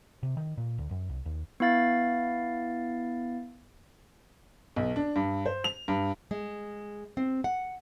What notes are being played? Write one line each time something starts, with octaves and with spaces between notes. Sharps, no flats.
C3
D#3
A#2
D2
F#2
C2
D#2
B3 E4 F5 A6
B1
D4
G2
C5
F7
G2
G#3
C4
F#5